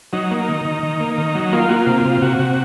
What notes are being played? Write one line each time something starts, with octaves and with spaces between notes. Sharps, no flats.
F#3 D#4
A#3
D#3
D#3
D#3
A#3
D#3
F#3
A#3 F4
A#3 F#4
F4
C3
F4
C3
C3 F#4
C3